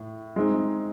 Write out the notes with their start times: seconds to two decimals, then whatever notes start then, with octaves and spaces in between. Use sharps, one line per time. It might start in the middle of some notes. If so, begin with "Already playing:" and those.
Already playing: A2
0.36 G#3 C4 D#4